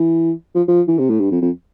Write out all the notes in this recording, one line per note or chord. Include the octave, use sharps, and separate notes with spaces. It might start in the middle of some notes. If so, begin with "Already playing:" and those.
Already playing: E3
F3
F3
E3
C3
A2
G2
F2
F2